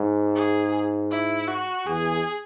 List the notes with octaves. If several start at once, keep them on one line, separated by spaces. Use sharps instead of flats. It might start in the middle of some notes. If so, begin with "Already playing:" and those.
Already playing: G#2
G#4
E4
F#4
E2 G#4